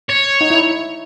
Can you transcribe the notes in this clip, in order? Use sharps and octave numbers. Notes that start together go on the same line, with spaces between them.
C#5
D#4
E4